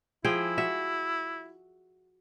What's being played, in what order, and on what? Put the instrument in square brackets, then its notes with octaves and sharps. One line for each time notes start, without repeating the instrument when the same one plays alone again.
[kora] F3 G#4 G5 [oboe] E4
[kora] F#4 E5